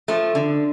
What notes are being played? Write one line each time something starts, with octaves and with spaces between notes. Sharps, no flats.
F3 A3
D3